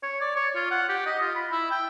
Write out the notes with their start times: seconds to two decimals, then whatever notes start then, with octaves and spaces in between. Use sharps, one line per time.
0.03 C#5
0.21 D5
0.36 C#5
0.55 F4
0.71 F#5
0.89 G4
1.06 D#5
1.21 F4
1.35 B5
1.52 E4
1.71 G5